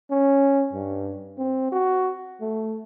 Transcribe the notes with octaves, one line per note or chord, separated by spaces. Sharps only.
C#4
G2
C4
F#4
A3